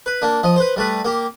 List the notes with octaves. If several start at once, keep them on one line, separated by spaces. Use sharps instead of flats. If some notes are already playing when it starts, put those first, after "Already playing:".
B4
A#3 D4
F3 D#5
B4 C5
G3 A3 B4
A#3 G4